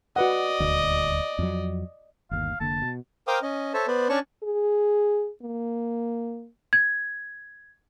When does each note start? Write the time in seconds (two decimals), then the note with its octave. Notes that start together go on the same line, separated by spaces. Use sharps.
0.16 F#4 B4 D5 D#5 F#5
0.60 D#1 D2
1.39 F2 F#3
2.31 G1 D#2 F5
2.60 F1 D3 A#3 A5
2.82 B2
3.27 A#4 C5 F5 G5 D6 D#6
3.42 C#4 D#5
3.74 A4 C5 C#5 E5 A5
3.88 B3 B4 C5 D5
4.09 C#4 D4 C#5 D5 A5 C#6
4.43 G#4
5.43 A#3
6.73 G#6